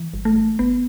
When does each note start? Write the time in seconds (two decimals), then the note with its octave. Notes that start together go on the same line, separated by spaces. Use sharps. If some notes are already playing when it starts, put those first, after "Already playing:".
Already playing: E3
0.14 G1
0.25 A3
0.36 G1
0.59 G1 B3